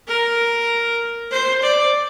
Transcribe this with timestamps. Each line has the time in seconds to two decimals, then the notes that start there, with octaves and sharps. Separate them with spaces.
0.08 A#4
1.31 C5
1.62 D5